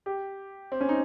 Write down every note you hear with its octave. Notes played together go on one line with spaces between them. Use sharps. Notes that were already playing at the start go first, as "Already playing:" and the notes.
G4
C4
C#4
D#4